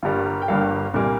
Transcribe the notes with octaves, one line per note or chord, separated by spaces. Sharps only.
G1 G2 G3 A#3 F4
A#4
G5
G1 G2 G3 A#3 F5
C2 A#2 G3 A#3